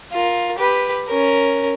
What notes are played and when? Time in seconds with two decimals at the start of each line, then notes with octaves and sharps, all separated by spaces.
0.12 F4 A#4
0.58 G4 B4
1.08 C#4 A#4